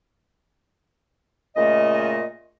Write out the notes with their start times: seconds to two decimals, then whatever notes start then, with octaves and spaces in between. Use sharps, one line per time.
1.55 A#2 C#3 A3 D#5